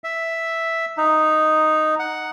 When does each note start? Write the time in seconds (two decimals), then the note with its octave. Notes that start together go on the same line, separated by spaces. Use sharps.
0.04 E5
0.97 D#4
1.99 F#5